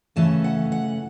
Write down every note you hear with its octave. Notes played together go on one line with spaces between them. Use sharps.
C#3 E3 A3 C#4 A5
F#5
F#5